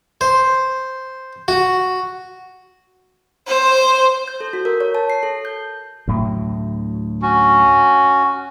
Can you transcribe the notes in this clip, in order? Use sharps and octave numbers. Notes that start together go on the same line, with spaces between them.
C5
F#4
C5
G6
A4
F#4
A#4
C#5
A5
C7
A4
G6
D2 A2 F#3
C#4 F#4